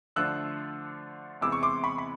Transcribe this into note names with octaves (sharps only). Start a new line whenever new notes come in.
D3 F3 A3 D4 F4 E6 F#6
C3 E3 G#3 B3 E4 D6 E6
C#6
C6 D6
B5 C#6
B5